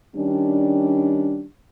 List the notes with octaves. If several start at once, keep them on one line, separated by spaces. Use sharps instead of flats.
D#3 G3 C#4 D4